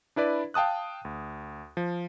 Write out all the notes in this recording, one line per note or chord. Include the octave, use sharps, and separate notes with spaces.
D4 E4 B4 D5
F5 G5 A5 D#6 F#6
D2
F3